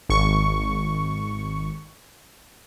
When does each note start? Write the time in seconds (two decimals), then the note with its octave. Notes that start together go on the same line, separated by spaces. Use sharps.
0.09 G#1 C#6